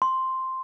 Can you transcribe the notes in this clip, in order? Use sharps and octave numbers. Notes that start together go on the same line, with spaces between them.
C6